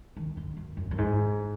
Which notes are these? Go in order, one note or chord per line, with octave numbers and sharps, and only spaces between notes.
D#3
D3
F#2
F#2
F#2
G#2